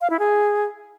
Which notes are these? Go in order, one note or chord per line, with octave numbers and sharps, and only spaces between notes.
F5
E4
G#4